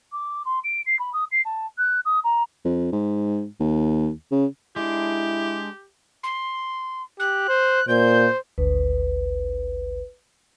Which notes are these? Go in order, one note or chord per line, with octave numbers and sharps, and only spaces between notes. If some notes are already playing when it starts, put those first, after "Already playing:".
D6
C6
D7
C7
B5
D#6
C7
A5
F#6
D#6
A#5
F2
G#2
D#2
C#3
G#3 D4 E4 G4
C6
G4 F#6
C5
A#2 C5 G6
G#1 D2 B4